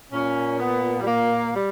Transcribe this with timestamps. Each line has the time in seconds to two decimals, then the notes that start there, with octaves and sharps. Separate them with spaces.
0.13 A#2 C#4
0.59 B3
1.00 G3
1.07 A#3
1.54 G3